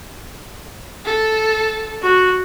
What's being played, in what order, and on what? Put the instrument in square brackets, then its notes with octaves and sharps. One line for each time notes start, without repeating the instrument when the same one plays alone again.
[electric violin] A4
[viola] F#4